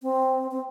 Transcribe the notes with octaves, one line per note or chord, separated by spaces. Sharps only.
C4
C4